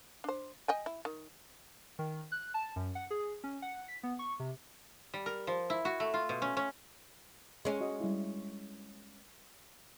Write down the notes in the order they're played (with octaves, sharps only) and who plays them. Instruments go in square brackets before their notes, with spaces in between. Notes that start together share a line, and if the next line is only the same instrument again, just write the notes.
[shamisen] D4 C5
D#5 G5 G#5
E4
D#3
[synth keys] D#3
F#6
A5
F#2
F#5
G#4
C#4
F#5
B6
B3
C#6
C3
[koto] G3
A#4
F3
E4
F#4
A3
F4
B2
C#4
C#4
[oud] G#3 C#4
[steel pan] F#4 D#5
G3 E4